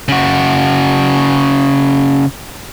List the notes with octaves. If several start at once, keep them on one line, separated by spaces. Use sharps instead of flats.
C#3 F#4